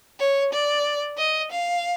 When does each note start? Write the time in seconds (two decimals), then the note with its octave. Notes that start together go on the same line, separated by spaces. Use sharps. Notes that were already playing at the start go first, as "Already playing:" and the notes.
0.19 C#5
0.53 D5
1.18 D#5
1.52 F5